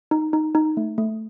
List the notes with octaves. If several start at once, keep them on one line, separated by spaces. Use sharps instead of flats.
D#4
D#4
D#4
A3
A3